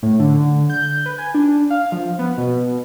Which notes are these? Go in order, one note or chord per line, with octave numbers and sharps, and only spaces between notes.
A2
D3
G6
B4
G#5
D4
F5
F3
B3
B2